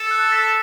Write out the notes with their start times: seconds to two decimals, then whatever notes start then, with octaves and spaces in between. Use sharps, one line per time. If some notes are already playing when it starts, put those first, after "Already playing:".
Already playing: A4
0.11 F#6
0.32 B6